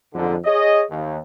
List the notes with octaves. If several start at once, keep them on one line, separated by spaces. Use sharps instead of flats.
F2 G#2 D3
G#4 C#5 D#5
D#2